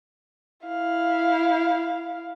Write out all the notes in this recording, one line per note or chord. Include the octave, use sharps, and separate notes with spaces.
E4 F5